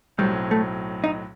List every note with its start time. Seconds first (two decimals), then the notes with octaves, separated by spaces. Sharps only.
0.18 B1 A2 F#3 G3 C4
0.51 A3
1.04 D#4